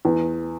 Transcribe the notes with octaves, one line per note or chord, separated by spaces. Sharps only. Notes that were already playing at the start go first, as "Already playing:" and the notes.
E2